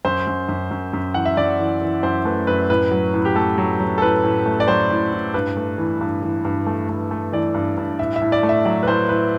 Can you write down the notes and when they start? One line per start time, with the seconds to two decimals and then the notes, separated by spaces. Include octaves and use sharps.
0.05 F#2 C5
0.27 F#2
0.48 F#2
0.71 F#2
0.93 F#2
1.14 E3 F#5
1.25 E5
1.37 F#2 D5
1.60 E3
1.81 E3
2.03 F#2 C5
2.25 A3 B4
2.47 F#2 B4
2.70 A2 B4
2.91 F#3
3.14 A2
3.25 G4
3.36 A3 A4
3.58 F#3
3.80 F#3
3.98 A4
4.02 A2 B4
4.24 A2
4.46 A3
4.60 D5
4.68 F#3 C5
4.90 A2
5.13 A2
5.34 G2 B4
5.57 A3
5.78 E3
6.01 G2
6.22 E3
6.45 G2
6.67 A3
6.89 G2
7.11 A3
7.32 E3 D5
7.54 G2
7.77 G2
7.99 A2 E5
8.16 E5
8.21 A2
8.32 D5
8.43 A3
8.49 E5
8.65 F#3 D5
8.83 B4
8.88 A2 C5
9.09 A2 B4